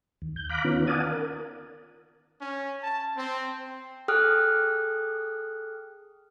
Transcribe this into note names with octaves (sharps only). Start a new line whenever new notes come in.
D#2
G6
F5 A#5 B5 D6 F#6
D#3 B3 C#4 F4
D5 F5 F#5 G#5 A5 D#6
A#4
C#4
A5
C4
G#4 A4 G5 D#6 F6 F#6